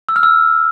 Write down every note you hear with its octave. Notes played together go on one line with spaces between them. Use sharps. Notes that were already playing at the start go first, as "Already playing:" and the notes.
E6
F6
E6